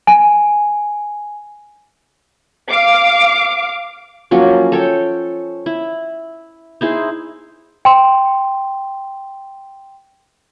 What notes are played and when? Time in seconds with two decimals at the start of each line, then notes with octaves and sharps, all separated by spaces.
0.07 G#5
2.68 F5 D6
4.31 F3 F#3 A#3 C#4
4.72 A4 C#5 G5
5.66 E4
6.81 D#4 E4 G#4 C5
7.85 G5 C6